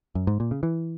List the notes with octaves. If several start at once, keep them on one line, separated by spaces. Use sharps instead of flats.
F#2
G#2
A#2
C#3
E3